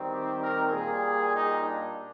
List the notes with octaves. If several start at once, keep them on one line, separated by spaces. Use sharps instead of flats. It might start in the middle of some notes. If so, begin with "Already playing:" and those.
Already playing: D#3 G3 C4
G4
A#4
A#2 G3 A#3 G#4
D#4
D4